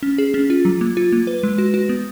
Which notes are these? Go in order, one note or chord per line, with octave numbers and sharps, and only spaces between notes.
C#4
G#4
C#4
F4
F#3
A#3
F4
A#3
B4
G#3
F#4
F#4
B3